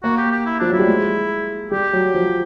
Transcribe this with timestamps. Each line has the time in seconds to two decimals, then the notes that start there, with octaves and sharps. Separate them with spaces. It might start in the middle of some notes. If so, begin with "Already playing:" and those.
0.03 A#3 F#4
0.18 G4
0.31 G4
0.46 E4
0.60 F3 D4
0.70 F#3 E4
0.79 G3
0.87 G#3
1.71 G3 G4
1.93 F#3
2.14 F3